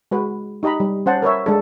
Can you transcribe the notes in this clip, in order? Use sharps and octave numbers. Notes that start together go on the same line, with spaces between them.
G#3 F#4 B4
D#4 G4 D#5 A#5 B5
G3
C#4 C5 F#5 A5
A#4 B4 C#5 E5
G#3 D4 A4